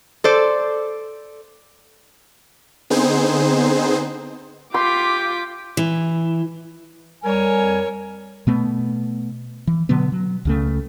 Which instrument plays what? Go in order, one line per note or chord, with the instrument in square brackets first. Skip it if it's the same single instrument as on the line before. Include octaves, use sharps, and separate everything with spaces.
[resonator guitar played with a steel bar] A4 C5 D5
[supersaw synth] D3 B3 C4 D#4 G#4 C5
[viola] F4 [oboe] G4 [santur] C6 [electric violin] D6 B6
[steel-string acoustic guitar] E3
[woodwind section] F2 G3 G#5 [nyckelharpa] A#4 C#5
[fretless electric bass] B2 A3 B3
E3
B2 D3 F#3 B3
F#3
C#2 C#3 A3